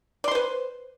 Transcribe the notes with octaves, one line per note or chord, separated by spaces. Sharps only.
B4 C5 D5 C6